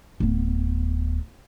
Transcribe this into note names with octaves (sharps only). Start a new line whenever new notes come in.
D1 B3